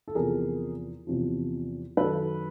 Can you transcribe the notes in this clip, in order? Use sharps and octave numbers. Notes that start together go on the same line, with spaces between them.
A4
E2 C3 F3 G#4 A#4
E2 C3 F3
F#2 D#3 A4 B4